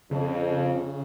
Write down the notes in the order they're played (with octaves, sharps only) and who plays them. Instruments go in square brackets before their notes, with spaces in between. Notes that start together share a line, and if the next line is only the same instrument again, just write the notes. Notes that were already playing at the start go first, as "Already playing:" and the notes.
[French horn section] F2 [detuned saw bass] C#3